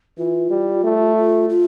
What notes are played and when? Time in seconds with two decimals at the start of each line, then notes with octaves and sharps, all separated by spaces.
0.18 E3 F4
0.50 G3
0.84 A3
1.17 F4
1.49 F4